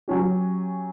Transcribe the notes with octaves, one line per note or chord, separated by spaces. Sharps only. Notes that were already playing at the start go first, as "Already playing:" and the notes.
F#3 C#4 G4